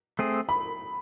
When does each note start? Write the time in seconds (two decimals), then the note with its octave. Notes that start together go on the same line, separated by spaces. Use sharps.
0.19 A3 C4 G#4
0.49 B5